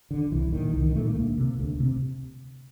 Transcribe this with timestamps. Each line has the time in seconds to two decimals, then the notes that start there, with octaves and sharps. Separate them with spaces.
0.11 D3
0.31 C2 E3
0.53 A#2 D#3
0.73 C2 D#3
0.84 D#3
0.95 A#2 A3
1.05 A#3
1.16 D2
1.38 C3
1.59 D2
1.80 C3